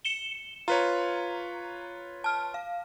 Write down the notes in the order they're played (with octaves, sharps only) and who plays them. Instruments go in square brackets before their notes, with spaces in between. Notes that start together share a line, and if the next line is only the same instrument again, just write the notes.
[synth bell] C#7 E7 G7
[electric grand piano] F4 B4 C#5 [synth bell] A#5
[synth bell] A5 F6
F5